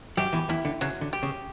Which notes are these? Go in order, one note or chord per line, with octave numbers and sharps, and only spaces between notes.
F#2 F#3 G4
E2 E3
E2 E3 E4
D3
C#3 F#3
D3
G4
C#3